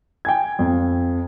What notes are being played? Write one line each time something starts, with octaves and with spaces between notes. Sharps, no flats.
G5 G#5 G#6
F2